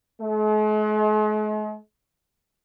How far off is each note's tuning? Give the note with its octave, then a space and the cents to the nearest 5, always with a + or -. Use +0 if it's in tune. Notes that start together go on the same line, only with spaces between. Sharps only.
G#3 +45